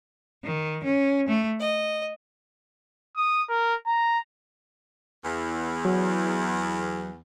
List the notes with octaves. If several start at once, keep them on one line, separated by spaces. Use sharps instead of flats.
D#3
C#4
A3
D#5
D#6
A#4
A#5
E2
F#3